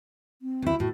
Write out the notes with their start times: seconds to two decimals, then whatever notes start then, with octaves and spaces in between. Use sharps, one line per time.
0.42 C4
0.62 D2 E4
0.80 A2 F#4